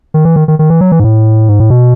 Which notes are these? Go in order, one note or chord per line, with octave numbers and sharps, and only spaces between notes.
D#3
E3
D#3
D#3
D#3
E3
F#3
E3
G#2
A2
G#2
A2
B2